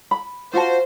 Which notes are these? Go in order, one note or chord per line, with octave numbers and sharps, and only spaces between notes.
B5
F4 F#4 C5 A5